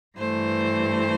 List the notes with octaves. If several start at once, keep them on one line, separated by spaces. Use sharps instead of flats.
G2 E3 A3 C5